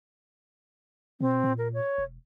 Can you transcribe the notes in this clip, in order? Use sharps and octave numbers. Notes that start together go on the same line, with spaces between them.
B2 C4
A#2
A#4
C#5
E1